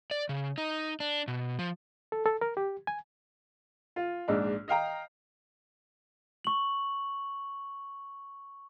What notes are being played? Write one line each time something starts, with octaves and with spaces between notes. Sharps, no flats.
D5
C#3
D#4
D4
B2
F3
A4
A4
A#4
G4
G#5
F4
A#1 G#2 D4
D#5 F5 G5 A#5
C#6 F#7